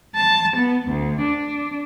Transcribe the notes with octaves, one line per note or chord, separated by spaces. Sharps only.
A5
B3
D2
D4